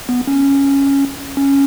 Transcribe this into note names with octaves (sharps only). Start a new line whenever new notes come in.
B3
C#4
C#4